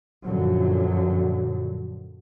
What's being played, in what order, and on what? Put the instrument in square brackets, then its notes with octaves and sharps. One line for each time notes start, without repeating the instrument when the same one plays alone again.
[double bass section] F#2 A#2 D3 F3 F#3